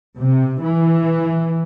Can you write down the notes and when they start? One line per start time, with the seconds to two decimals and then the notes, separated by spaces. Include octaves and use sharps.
0.19 C3
0.63 E3